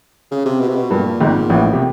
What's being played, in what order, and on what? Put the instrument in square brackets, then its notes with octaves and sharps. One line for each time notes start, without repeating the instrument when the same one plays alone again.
[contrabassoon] C#3
C3
B2
C3
B2
[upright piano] G2 [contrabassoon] A#2
[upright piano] G#1 G#2
A1 A2
C3